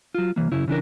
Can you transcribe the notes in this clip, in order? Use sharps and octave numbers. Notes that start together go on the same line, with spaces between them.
F#3 F4
C2 G#2 E3 A#3
F#2 C#3 E4
C#3 E3 D4 A#4